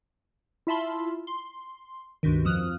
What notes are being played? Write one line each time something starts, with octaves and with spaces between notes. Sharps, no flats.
E4 F4 E5 A5 B5 C6
C6
C#2 G2 B2 D#3
F2 F3 D#6 F6 F#6